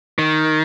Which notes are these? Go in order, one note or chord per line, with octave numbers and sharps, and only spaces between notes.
D#3